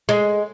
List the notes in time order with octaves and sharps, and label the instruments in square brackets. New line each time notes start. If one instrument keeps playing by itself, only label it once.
[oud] G#3